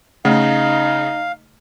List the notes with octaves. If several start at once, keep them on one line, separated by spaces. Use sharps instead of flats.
C#3 A3 D#4 F5